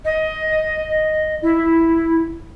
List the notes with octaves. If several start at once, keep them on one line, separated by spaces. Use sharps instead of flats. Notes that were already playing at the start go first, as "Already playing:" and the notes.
D#5
E4